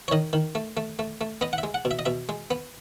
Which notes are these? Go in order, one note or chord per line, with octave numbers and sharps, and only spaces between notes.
C#5
D#3 D#5
D#3
A3
A3
A3
A3
B3 D#5
F#5
E5
G#3
F#5
B2
E5
D#5
B2 E5
G#3
B3